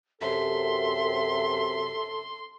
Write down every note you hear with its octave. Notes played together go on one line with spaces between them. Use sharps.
F#2 C3 A4 E5 C6